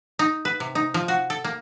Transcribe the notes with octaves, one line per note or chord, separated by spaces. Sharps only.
D#4
B4
C3
D#4
F3
F#4
A4
A#3